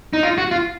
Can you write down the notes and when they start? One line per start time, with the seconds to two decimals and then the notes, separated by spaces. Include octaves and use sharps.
0.13 D#4
0.23 F4
0.38 F#4
0.51 F4